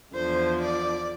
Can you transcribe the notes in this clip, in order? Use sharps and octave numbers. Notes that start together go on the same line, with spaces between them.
E2 D3 F3 C5
D5